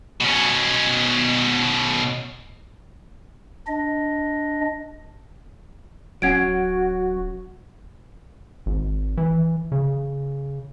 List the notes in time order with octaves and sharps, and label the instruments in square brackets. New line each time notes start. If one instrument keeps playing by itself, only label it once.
[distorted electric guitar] B2 C#4
[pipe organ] D4 D#5
[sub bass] D1 [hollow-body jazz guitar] F#3 C#4 [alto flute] F#4 [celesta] F#5 G#6 D7
[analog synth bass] G#1
E3
C#3